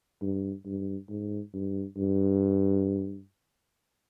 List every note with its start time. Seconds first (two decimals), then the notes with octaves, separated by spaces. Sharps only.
0.22 G2
0.66 G2
1.09 G#2
1.53 G2
1.97 G2